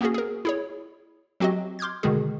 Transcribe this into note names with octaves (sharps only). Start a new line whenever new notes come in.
A#3 B3 C#4 F#4 G#4
G#4 A#4
E4 G#4 C#5
F#3 C4 F#4 G4 D#5
C6 D6 F6 G6 G#6
B2 D3 D#3 G#3 F#4 G#4